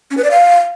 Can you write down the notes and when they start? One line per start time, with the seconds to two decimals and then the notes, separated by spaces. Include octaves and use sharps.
0.11 C#4
0.17 B4
0.24 D5
0.31 F5